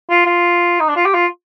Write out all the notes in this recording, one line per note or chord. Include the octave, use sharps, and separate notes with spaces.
F4
F4
D#4
D4
F4
G4
F4